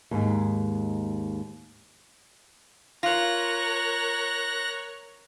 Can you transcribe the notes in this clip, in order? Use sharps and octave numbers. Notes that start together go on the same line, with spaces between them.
D#2 G#2
F4 A#4 C#5 F#6 A#6